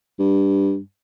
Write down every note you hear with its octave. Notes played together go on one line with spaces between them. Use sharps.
G2